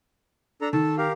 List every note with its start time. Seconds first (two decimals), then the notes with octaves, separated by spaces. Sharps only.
0.62 D4 A4 A#5
0.73 D#3 A4 A5
0.98 G4 A#4 F5